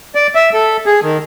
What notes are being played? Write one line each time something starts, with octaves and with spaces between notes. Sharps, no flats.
D5
E5
A4
G#4
D#3